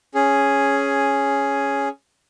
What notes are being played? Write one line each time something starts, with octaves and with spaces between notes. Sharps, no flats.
C#4 G#4